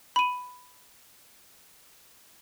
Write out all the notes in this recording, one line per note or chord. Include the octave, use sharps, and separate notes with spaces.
B5 D#7